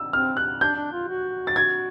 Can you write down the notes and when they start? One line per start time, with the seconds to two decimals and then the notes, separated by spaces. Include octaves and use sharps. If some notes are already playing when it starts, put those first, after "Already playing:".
Already playing: E6
0.13 C4 F6
0.37 F#6
0.61 D4 G6
0.76 D4
0.93 F4
1.08 F#4
1.47 A6
1.56 G#6